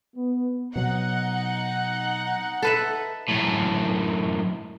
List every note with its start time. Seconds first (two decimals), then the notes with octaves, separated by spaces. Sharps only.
0.16 B3
0.76 B2 F#3 D#4 F#5
2.62 A4 B4 E5
3.29 F#2 A2